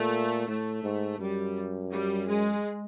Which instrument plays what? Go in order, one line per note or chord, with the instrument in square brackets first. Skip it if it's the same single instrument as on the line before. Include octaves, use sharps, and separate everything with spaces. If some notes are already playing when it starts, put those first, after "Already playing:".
Already playing: [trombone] A#2 [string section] A3
[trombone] A2 [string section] A3
[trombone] G#2
[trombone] F#2 [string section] G3
[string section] G3
G#3